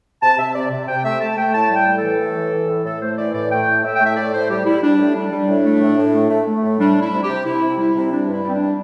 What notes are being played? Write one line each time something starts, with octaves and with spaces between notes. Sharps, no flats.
C3 A5
C3 E5
C3 D5
C3
C3 G5
A3 E5
A3 A5
A3 G5
A2 A5
G3
G5
A2
A4
E3
A2
E3
A2
A2
A2 A4
A3 C5
E3 D5
A2 D5
A3 G5
A2
A2 E5
A3 G5
E5
A2 D5
A2 C5
G3 G4
G3 E4
G3 D4
A2
G3 D4
G3
A2
A3
A2
A2
A3
A3
A3
A2
G3 D4
G3
E4
C3
G4
C3
C3 E4
C3
G3 E4
C3
G3 D4
G2
E4
G3 C4
D4
G3